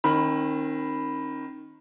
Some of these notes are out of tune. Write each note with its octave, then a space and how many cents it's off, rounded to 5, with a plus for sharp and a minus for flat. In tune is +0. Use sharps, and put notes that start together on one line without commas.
D#3 -5 C4 +45 B5 +0